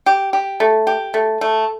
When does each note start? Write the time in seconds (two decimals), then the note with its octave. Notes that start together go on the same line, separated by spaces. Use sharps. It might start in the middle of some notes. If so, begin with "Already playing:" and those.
0.06 G4
0.33 G4
0.60 A3
0.87 G4
1.14 A3
1.41 A3